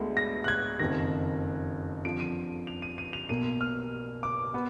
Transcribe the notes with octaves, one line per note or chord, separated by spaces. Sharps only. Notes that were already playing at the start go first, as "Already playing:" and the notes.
Already playing: D2 D3 G#3 B3
A#6
F#6
G#6
F#1 F2 D#3 A#6
F2 D3 F3 D7
D#7
F7
D#7
D#7
F7
B1 B2 A#3 D#7
F6
D6
B3